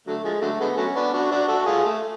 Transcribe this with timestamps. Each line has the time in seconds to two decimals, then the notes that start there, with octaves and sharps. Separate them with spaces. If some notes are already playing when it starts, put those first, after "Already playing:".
0.07 D3 F#3 A3
0.24 F3 G#3
0.41 D3 F#3 A3
0.60 D3 G#3 B3
0.77 F#3 A3 C#4
0.95 B3 D4
1.13 D4 F#4
1.31 D4 F#4
1.48 F#4 A4
1.66 F4 G#4
1.85 A3